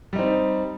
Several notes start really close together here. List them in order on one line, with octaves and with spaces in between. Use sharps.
G3 D#4 C4